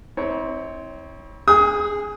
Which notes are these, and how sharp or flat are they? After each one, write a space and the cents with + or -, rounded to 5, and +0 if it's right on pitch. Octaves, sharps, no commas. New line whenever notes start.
C4 +0 E4 -45 C#5 +10
G#4 +0 G#5 -45 D#6 +25